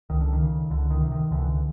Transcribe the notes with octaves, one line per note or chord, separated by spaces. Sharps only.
C#2 D#3
D3
D#3
C#3
C#2 D3
D#3
C3
D#3
C#2 D3 E3